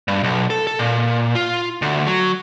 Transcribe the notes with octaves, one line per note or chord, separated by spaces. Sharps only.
G2
B1
A4
A4
A#2
F4
D2
F#3